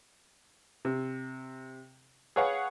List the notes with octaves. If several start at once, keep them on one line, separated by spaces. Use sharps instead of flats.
C3
G#4 B4 C#5 F5 F#5